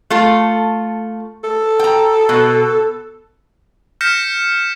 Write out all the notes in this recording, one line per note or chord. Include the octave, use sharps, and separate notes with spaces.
A3 F4 A4
A4
G5 A#5
B2
F6 G6 A#6 B6 C#7 E7